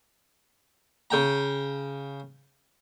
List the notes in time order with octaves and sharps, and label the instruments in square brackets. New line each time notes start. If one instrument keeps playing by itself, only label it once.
[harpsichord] C#3 G5 A#5